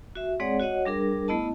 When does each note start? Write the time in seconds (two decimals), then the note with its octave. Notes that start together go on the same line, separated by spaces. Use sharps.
0.15 F#4 E5
0.40 G#3 C4 G#4 C#5 D5 F#5
0.59 F#4 C#5 D#5 F#5
0.85 G3 D4 G#4 A#4
1.28 A3 B3 E4 D#5 A5